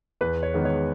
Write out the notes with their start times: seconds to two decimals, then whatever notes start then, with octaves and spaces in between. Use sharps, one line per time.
0.21 E2 B4
0.43 C#5
0.54 D#3 G#3 B3
0.65 C#5